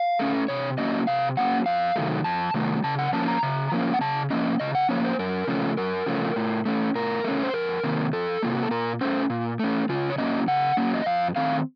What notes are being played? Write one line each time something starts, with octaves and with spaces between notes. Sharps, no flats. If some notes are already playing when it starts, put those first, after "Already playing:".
Already playing: F5
A3 C#4
C3 C#5
F#3 A#3 C#4 D#5
C3 F5
F#3 A#3 C#4 F#5
F2 F5
C3 D#3 F#3 A3
F2 A5
C3 D#3 F#3 A3
C#3 A5
F#5
F3 A#3 C#4 A5
A#5
C#3
F3 A#3 C#4
F#5
C#3 A5
F3 A#3 C#4 D#5
C#3 D#5
F#5
F3 A#3 C#4 C#5
C5
F#2 A#4
C#3 F3 A3 C#4
F#2 A#4
C#3 F3 A3 C#4
A2
A3 C#4
A2 A#4
A3 C#4
C5
F2 A#4
C3 D#3 A#3
F2 A4
C3 D#3 A#3 F4
F#4
A4
A#2 A#4
A3 C#4 C5
A#2
A3 C#4
C#3 F4
C#5
F#3 A#3 C#4 D#5
C#3 F#5
F#3 A#3 C#4
D#5
F2 F5
D#3 A3 C4 F5